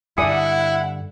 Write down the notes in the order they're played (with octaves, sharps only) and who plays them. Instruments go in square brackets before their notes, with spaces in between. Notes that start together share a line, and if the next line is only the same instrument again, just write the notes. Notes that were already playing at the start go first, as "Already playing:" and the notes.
[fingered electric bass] G2 D3 [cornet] E4 [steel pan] D5 G#5 D#6 [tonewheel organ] F#5